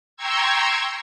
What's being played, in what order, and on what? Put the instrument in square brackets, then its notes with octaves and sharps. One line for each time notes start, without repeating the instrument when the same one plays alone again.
[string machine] G5 A#5 C6 C#6 E6 G#6